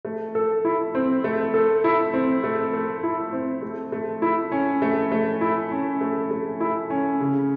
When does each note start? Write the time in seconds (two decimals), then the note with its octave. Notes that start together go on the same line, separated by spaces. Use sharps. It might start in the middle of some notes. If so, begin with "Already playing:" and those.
0.05 A3
0.35 A4
0.65 E4
0.95 C4
1.24 A3
1.54 A4
1.84 E4
2.14 C4
2.44 A3
2.73 A4
3.03 E4
3.33 C4
3.62 A3
3.92 A3
4.22 E4
4.52 C#4
4.82 A3
5.12 A3
5.41 E4
5.71 C#4
6.01 A3
6.31 A3
6.60 E4
6.90 C#4
7.21 C#3